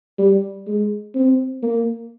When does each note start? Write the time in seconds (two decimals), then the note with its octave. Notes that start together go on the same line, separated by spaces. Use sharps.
0.18 G3
0.67 G#3
1.15 C4
1.63 A#3